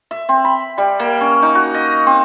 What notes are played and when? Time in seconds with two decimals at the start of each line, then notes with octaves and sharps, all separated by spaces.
0.11 E5
0.29 C4
0.45 B5
0.78 G3
0.99 A#3
1.21 C#4
1.42 D#4
1.55 F#4
1.74 D#5
2.06 C4